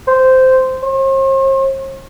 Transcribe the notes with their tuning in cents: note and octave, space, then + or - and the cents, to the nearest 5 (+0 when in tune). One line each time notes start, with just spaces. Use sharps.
C5 -10
C5 +45